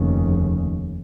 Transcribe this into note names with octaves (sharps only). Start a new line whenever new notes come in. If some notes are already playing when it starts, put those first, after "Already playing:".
Already playing: F1 D#2 C#3